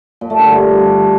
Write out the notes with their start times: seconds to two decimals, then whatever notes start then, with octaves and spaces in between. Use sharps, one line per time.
0.21 A#2
0.30 A3
0.39 D3
0.48 G2